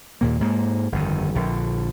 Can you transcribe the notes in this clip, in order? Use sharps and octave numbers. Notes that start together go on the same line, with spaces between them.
D#2 A#2 A#3
G#2 A#3
G1 F2 D#3
A#1 D3